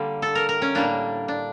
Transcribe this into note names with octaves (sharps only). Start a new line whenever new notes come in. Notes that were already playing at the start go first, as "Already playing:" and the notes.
Already playing: D3 G3 A#3
A4
A#4
A#4
C#4
A2 G3 A#3 D4
D4